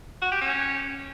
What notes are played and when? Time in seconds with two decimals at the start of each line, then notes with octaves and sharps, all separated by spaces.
0.22 F#4
0.32 G4
0.41 C#4